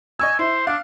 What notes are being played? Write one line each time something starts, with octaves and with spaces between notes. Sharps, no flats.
D#5 G#5 C#6 E6
E4 C5
D4 F5